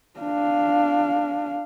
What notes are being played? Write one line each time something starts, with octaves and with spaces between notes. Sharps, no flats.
D4 F5